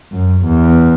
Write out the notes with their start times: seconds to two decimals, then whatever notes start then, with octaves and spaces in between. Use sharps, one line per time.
0.12 F#2
0.46 E2